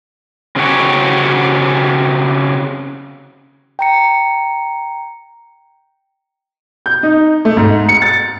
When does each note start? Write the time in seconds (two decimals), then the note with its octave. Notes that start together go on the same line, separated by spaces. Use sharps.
0.56 C#3 C4 C#4 F#4 G4 C#5
3.79 G5 A#5 C#7
6.86 G6
7.03 D#4
7.45 A3
7.57 G#2
7.89 C#7
8.02 A6